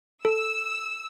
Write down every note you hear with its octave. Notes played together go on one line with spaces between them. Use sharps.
A4 E6